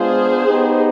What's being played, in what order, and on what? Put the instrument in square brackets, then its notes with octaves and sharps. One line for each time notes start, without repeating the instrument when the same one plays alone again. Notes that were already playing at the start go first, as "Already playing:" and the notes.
Already playing: [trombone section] G#3 B3 D4 F4 [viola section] G#4 C5
[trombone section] B3 D#4 G4